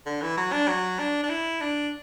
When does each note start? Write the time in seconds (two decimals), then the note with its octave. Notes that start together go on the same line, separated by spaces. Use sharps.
0.06 D3
0.22 E3
0.37 F#3
0.53 D4
0.68 F#3
0.99 D4
1.23 D4
1.29 E4
1.60 D4